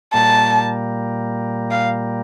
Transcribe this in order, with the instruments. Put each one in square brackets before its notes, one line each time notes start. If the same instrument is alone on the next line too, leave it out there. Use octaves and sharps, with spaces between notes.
[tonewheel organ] A#2 G3 A#3 [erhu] A5
[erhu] F5